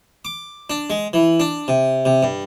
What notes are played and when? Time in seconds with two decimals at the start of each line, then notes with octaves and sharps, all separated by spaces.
0.25 D6
0.70 D4
0.90 G#3
1.13 E3
1.40 D4
1.68 C3
2.05 C3
2.23 G2